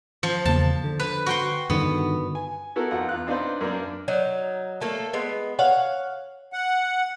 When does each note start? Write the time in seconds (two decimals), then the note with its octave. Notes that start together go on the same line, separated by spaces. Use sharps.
0.23 F3
0.45 E2 C#3 A#3 A5
0.84 D3
1.00 B4
1.26 F#4 G5 C6
1.70 G2 D3 D#3 B3
2.35 G#5
2.76 B3 E4 F#4 A4 A#4
2.91 F2 D#4 F4 F#5
3.09 E2 F4 F#6
3.27 C4 D4 D#4 F4 B4 C5
3.61 F#2 A#3 D4
4.08 F#3 D#4
4.81 A3 A#3 A4
5.13 G#3 B3
5.59 C#5 F5 F#5
6.53 F#5